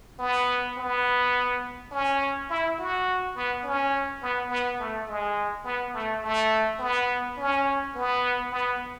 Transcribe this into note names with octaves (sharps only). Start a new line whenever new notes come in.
B3
B3
C#4
E4
F#4
B3
C#4
B3
B3
A3
G#3
B3
A3
A3
B3
C#4
B3
B3